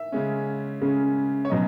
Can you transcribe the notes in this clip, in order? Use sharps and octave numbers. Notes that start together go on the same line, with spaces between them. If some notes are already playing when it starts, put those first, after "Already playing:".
Already playing: E5
C#3 G#3 C#4
C#3 G#3 C#4
C#5
B2 F#3 C#4 D#5